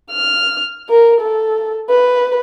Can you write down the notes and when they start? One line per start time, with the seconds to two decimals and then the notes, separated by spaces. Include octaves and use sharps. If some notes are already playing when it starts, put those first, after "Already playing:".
0.11 F6
0.89 A#4
1.21 A4
1.89 B4